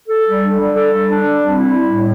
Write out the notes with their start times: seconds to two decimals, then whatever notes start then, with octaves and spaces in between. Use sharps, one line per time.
0.08 A4
0.25 G3
0.42 D4
0.58 G3
0.75 A4
0.92 G3
1.09 D4
1.24 G3
1.42 C4
1.58 E4
1.74 G3
1.91 A2